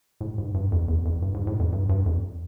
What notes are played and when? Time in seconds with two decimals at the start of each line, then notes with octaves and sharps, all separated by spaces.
0.21 A2
0.38 G#2
0.54 G2
0.72 F2
0.88 E2
1.05 F2
1.22 G2
1.34 G#2
1.47 A2
1.59 F2
1.73 G2
1.89 G2
2.06 F2